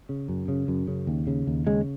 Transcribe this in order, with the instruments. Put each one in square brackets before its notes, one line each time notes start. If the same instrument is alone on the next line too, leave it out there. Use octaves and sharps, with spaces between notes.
[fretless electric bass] C#3
F#2
C#3
F#2
C#3
D#2
C#3
D#2
C#3 G#3